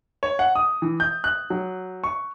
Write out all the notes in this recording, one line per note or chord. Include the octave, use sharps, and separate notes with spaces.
C#5
F#5
D#6
E3
G6
F#6
F#3
C#6